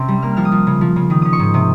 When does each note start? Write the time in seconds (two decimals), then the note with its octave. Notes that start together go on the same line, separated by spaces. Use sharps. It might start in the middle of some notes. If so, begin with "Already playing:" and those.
Already playing: C3 C4 C#4
0.08 G3
0.22 A#3 F6
0.37 F3 F6
0.45 D#6
0.52 F3
0.67 C#3
0.81 F3
0.96 C#3
1.10 D#3 D#6
1.22 C#4 D#6
1.33 C#6
1.40 G#2 D#6
1.54 C3 D#6